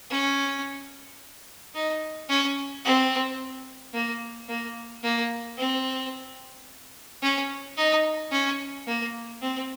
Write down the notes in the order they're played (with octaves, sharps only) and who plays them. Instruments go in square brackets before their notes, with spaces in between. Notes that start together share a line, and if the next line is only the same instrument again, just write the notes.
[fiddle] C#4
D#4
C#4
C4
A#3
A#3
A#3
C4
C#4
D#4
C#4
A#3
C4